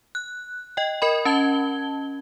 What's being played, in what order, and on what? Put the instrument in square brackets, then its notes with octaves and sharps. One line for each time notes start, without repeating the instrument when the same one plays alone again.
[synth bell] F#6
D#5 G5
A#4 D#5 B5
C#4 A5 G#6 G7